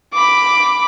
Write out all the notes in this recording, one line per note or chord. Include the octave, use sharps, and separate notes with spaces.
B5 D6